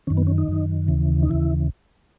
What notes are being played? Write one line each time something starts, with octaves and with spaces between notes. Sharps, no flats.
F#2 D#3 C#4
B3
C#4
D#4
F#2 D#3
D#2 C#3 E3
D#4
D#2 C#3 E3 E4